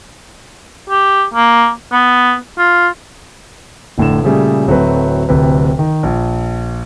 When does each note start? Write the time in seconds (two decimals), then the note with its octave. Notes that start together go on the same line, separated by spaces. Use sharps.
0.90 G4
1.34 A#3
1.92 B3
2.58 F4
3.98 F1 A2 D3 E7
4.23 A#2 C#3 G3 A3 G#4
4.67 D1 F#3 A3 C4 B4
5.29 D1 D2 C3 B4
5.79 D#3
6.03 A#1